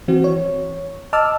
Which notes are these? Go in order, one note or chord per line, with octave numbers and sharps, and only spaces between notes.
E3 C4 F#4
C#5
D#5 A5 D6 E6 F6